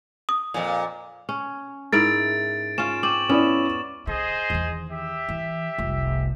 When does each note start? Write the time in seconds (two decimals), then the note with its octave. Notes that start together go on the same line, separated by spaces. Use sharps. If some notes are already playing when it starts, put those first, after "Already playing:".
0.29 D#6
0.54 F2 A#2
1.29 C#4
1.93 G#2 E4 A#4 A6 D7
2.78 C#4 F4 E7
3.03 C4 C#6 D6 F#7
3.29 B3 C#4 E4 D5
4.07 D3 G#4 C5 D#5
4.50 E2 D#3
4.91 G4 E5
5.29 E3
5.78 F1 C2